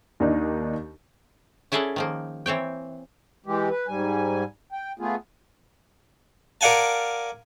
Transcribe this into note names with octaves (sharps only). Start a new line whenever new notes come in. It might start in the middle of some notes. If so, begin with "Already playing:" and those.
D#2 D#3 D4 D#4
C#4 E4 G#4 A4 D5 F#5
D#3 F3 A#3
E3 C4 C#5 G5
E3 G#3 G4
B4
G#2 G3 G#5
G5
A3 B3 F4 G#4
A#4 D5 F5 F#5 G#5 A5